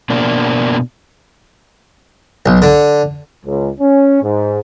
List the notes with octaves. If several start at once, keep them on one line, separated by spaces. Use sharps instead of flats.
B2 A#3 D4
B1
D3
C#2
C#4
G#2